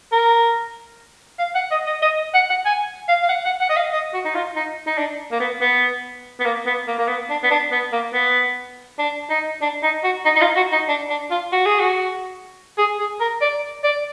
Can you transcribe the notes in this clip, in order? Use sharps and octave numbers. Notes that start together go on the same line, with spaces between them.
A#4
F5
F#5
D#5
D#5
D#5
F#5
F#5
G#5
F5
F5
F#5
F#5
F#5
D#5
F5
D#5
F#4
D#4
F4
D#4
D#4
D4
A#3
B3
B3
B3
A#3
B3
A#3
A#3
B3
D4
B3
D4
B3
A#3
B3
D4
D#4
D4
D#4
F#4
D#4
D#4
F4
F#4
D#4
D4
D4
F4
F#4
G#4
F#4
G#4
G#4
A#4
D5
D5